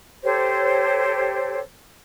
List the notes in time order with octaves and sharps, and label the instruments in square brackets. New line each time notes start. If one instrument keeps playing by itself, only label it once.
[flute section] G4 A4 C5 C#5